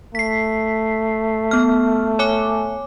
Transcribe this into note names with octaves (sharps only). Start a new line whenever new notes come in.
A3 B6 C7
B3 F6
C#5 G#5 D6